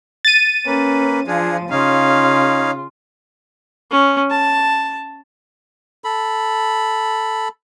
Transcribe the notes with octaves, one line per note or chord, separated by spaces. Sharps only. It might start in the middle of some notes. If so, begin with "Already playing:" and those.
A6 D#7
A#3 C#4 B4
F3 D4 F4 G#4
C#3 C#4 D#4 F4 F5
C#4
A5
A4 B5